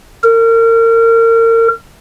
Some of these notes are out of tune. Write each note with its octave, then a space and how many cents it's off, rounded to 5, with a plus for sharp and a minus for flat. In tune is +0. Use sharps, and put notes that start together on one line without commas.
A#4 -35